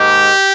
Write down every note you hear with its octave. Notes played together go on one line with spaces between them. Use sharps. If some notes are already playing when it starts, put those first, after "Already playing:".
Already playing: G#2 D#3 G#3 G4